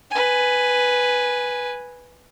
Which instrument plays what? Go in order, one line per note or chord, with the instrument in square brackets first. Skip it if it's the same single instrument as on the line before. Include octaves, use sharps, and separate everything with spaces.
[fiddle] B4 G#5